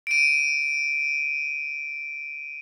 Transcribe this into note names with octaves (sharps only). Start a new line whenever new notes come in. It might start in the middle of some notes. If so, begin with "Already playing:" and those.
D7 D#7